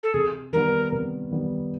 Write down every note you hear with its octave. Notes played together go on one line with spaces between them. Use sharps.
A4
C3 G#4
D#3 G3 B3 A#4
C3
D#3 G3 B3